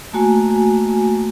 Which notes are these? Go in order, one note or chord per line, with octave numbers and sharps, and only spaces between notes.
A3 A#3 F#4 G#5